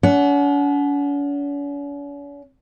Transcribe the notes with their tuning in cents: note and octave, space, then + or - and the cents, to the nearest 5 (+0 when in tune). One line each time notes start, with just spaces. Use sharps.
C#4 +45 F#5 +0